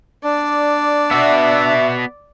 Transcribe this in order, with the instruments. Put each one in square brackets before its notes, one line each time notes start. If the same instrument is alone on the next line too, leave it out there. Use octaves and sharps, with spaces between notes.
[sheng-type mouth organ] D4 [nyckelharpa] D5
[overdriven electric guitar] B3 F#4 [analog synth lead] E5